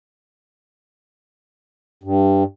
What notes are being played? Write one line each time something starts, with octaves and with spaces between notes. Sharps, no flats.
G2